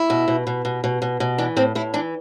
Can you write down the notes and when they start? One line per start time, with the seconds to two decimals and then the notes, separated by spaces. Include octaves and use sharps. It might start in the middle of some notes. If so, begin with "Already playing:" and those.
Already playing: E4
0.10 B2
0.28 B2
0.47 B2
0.65 B2
0.84 B2
1.02 B2
1.20 B2
1.38 E3 D4
1.57 A2 C4
1.75 A2 E4
1.94 E3 D4